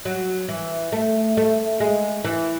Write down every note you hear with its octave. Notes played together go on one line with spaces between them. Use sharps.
F#3
E3
A3
A3
G#3
E3